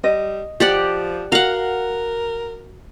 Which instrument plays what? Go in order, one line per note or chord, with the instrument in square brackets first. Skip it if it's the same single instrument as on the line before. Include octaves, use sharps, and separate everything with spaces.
[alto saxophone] G3 [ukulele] D#5
[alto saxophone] F3 [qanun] G4 D5 F#5
[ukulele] F#4 [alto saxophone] A#4 [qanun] F5 F#5